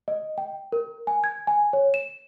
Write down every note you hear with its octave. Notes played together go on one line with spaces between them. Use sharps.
D#5
G5
A#4
G#5
G#6
G#5
C#5
E7